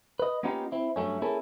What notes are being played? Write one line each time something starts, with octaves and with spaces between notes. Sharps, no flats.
B4 D#5
A#3 B3 C#4 D#4 F4 G4
C4 E4
G2 F#3 G#3 A3 C#4
A#3 C#4 E4 G#4 A4